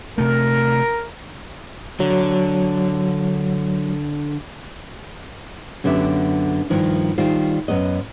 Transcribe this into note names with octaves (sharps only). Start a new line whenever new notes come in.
C3 A3 A#4
D3 F#3
F#2 D3 B3 G4 E5
G2 D#3 F3 E4
D#3 G3 F4 C5
F#2 B3 D#5